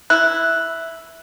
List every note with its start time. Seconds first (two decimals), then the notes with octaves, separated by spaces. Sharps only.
0.10 E4 F#6